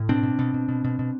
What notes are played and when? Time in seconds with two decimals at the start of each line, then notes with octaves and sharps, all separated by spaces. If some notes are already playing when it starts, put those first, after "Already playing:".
Already playing: A2
0.09 B2 C4 D4
0.23 B2
0.39 B2
0.54 B2
0.68 B2
0.84 B2
0.99 B2